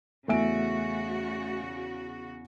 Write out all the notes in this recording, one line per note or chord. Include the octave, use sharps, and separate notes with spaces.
E2 C#3 A3 F#4 E5 G#5 D7